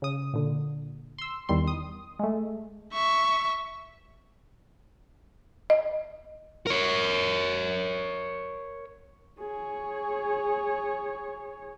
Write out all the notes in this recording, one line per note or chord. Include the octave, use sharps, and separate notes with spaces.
C#3 D#6
A#2 D3
C6 E6
E2 D#3 G3 C6
D#6
G#3 A3
E5 C#6
D#5
A#4 C#5
G#4 C#5